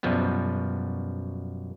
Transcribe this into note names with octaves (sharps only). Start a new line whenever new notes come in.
F#2 B2 F3 G3 B3